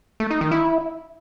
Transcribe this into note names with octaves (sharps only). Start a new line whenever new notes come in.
A3
D#4
D#3
E4